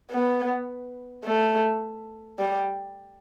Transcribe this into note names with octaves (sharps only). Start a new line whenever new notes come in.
B3
A3
G3